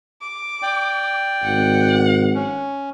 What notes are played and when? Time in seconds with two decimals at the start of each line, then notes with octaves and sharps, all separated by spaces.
0.21 D6
0.62 D5 G5
1.44 G#1 F#5
2.35 C#4